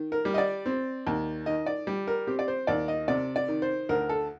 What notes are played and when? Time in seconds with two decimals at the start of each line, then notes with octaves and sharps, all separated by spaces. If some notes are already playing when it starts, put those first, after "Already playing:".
Already playing: D#3
0.12 A#4
0.25 G3
0.34 D#5
0.38 D5
0.66 C4
1.07 D#2
1.46 D#3 D#5
1.66 D5
1.87 G3
2.07 A#4
2.27 C4 G4
2.39 D5
2.48 C5
2.67 D#2 D5
2.88 D#5
3.08 C3 D5
3.36 D5
3.48 D#3
3.62 C5
3.89 D2 A#4
4.09 A4